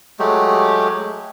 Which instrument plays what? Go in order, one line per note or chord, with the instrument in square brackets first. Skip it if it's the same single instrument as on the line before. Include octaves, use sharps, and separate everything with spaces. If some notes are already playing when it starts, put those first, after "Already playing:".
[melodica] F#3 G#3 A3 G4